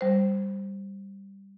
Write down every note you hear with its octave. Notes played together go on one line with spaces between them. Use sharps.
G3 C5